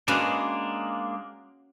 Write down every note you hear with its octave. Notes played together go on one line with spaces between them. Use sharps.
G#3 A#3 C#4 D4 F#4 B4